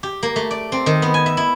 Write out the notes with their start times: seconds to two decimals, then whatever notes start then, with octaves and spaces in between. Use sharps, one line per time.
0.03 G4
0.23 A#3
0.36 A3
0.51 D5
0.72 C4
0.86 D#3
1.02 B3
1.14 G#5
1.26 E5
1.37 E4